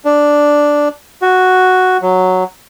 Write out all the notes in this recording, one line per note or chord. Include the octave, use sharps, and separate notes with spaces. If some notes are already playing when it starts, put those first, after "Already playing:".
D4
F#4
F#3